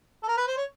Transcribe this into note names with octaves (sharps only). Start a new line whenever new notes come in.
A4
A#4
B4
C5
C#5